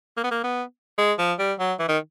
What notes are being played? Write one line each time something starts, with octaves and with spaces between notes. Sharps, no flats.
A#3
B3
A#3
B3
G#3
F3
G3
F#3
E3
D#3